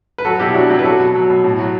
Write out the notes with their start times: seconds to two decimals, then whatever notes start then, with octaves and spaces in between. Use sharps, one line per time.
0.18 B4
0.25 F#3 F#4 A4
0.39 B2 E4 G4
0.54 F#3 D4 F#4
0.70 F#3 E4 G4
0.79 B4
0.84 F#3 F#4 A4
1.00 B2
1.15 F#3
1.30 B2
1.44 A2
1.59 F#3